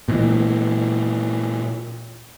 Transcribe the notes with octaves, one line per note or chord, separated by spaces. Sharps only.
A#2 E3